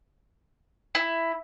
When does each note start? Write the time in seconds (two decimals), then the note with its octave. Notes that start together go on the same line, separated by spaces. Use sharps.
0.95 E4